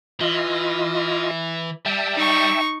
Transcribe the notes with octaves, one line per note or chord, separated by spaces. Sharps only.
E3 F4 D#5
G3 E5 G5 A5
D#4 C#6